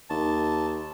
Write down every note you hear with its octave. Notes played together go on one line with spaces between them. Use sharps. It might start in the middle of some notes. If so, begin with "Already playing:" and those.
D#2 A5